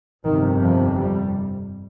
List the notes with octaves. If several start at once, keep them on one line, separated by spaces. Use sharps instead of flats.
G1 F2 C3 D#3
F3
G3